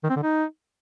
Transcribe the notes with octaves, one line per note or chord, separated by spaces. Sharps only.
D#3
C4
D3
D#4